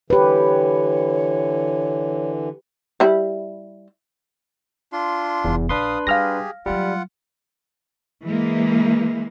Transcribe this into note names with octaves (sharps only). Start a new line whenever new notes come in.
D3 E3 G4 B4 C#5
G3 E4
D4 F4 C6
F1 E2 B3
A#1 D4 B4 F5 C6 D#6
G3 G4 G#4 F5 F6 A#6
F#3 G3 A3 F4 F#5
E3 G#3 A#3